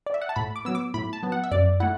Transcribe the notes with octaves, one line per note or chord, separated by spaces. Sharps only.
D5
E5
F#5
A5
A2 B5
D6
F#3 B3 E6
D6
A2 B5
A5
F#3 B3
F#5
E5
F#2 D5
A3 E4 F#5